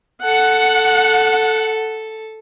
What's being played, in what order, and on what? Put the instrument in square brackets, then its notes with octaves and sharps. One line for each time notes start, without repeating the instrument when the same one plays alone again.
[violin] A4 [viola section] F#5